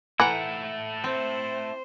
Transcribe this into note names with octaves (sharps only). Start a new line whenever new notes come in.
E3 A3 E4 F#5 G5 A#5
C4 C5